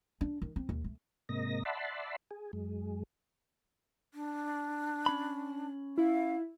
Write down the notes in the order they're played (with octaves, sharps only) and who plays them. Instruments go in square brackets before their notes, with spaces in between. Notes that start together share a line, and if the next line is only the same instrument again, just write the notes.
[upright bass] D4
D#3
C4
D#2
A3
[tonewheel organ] G#2 C3 A#3 D#5 A#6
D5 E5 F#5 A5 B5 C6
G#4
F#2 G#3
[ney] D4
[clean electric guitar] C#4 B5
[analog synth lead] E4 [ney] F5